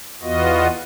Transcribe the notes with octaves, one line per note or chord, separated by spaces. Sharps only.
E2 B3 F4 F#4 D#5